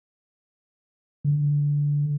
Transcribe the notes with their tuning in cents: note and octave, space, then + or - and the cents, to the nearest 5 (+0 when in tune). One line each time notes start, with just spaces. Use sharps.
D3 -15